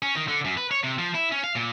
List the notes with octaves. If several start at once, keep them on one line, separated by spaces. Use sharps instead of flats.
C#4
D#3
D3
F#2
B4
C#5
C3
F3
E4
C#4
F5
A#2